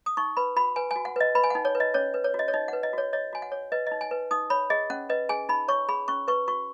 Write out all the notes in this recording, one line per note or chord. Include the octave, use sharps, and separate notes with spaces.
D#6
D#4 C#6
B4 B5
F#4 B5
B4 G#5
G#5
F#4
F#5
B4 D#5
B4 B5
G#5
F#5
D#4
C#5
B4
D#5
C#4 C#5
B4
C#5
F#4
D#5
C#5
D#4 D#5
F#5
B4
D#5
F#4 C#5
C#5 D#5
F#4 G#5
F#5
C#5
B4 D#5
D#5
D#4
G#5
B4
D#4 D#6
C#5 B5
G#4 D#5
C#4 F#5
B4 D#5
G#4 G#5
D#4 B5
C#5 C#6
G#4 B5
C#4 C#6
B4 C#6
F#4 C#6